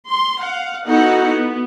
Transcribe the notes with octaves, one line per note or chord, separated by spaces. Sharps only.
C6
F5 F#5
B3 D#4 E4 F#4 A4 F#5
B3